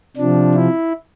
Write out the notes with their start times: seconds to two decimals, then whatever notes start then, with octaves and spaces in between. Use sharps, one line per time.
0.17 C3 F3 D4
0.54 E4